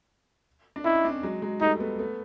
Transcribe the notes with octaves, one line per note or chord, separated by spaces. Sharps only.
D4
C#4 D#4 E4
C4 D4
F#3 G#3
F#3 G#3
G3 A3 D#4
A3 B3
A3 B3